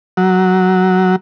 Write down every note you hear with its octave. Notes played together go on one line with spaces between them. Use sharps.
F#3